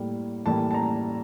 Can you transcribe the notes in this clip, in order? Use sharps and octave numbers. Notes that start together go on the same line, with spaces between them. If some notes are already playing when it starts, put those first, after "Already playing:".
Already playing: A2 G3 A#3
A2 E3 G3 A#3 A5
A5
A#5